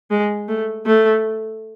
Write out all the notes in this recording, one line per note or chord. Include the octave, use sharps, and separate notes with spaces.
G#3
A3
A3